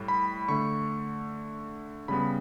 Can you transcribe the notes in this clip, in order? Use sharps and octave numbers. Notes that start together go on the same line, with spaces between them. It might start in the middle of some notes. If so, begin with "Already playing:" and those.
Already playing: A2 G3
B5
D3 A3 C#6
C#3 G3 B3 B5